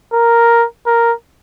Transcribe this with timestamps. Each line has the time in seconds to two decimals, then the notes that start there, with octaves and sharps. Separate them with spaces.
0.13 A#4
0.86 A#4